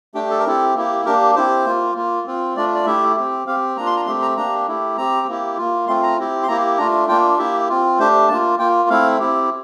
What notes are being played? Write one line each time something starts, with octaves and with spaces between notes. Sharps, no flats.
A3 D4 G4 G5
A4
A#4
C4 E4 G4 A4
A#3 E4 G4
A#3 D4 G4 A#4
C4 E4 G4 C5
A#3 F4
A#3 F4
C4 F4
A3 D4 F4 D5
D5
A3 E4 G4 E5
C4 G4
C4 G4 F5
A#3 D4 F4 A#5
C6
A#5
A3 C4 G4 C6
A#5
A#3 D4 G4 A#5
A3 E4 G4
C4 G4 A#5
A#3 E4 G4
A#3 F4
A3 C4 F4 C6
A#5
C4 E4 G4
C6
A#3 E4 G4 A#5
A3 D4 F4 A#5
A#3 D4 F4 G5
A#3 E4 G4 E5
C4 F4
A3 D4 G4 C5
A#3 F4 A5
A#3 F4 G5
A3 C4 E4 F5
C4 E4 G4